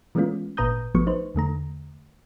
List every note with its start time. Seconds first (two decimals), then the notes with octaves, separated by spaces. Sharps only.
0.15 E3 G#3 A3 B3 C#4 F4
0.57 G#1 A#2 B4 A#5 D#6 G6
0.95 A1 F3 F#3 A3 B3 C#6
1.07 D#4 B4 C5
1.35 E2 D3 A3 A#5